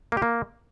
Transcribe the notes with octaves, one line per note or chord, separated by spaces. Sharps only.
A#3
G4
A#3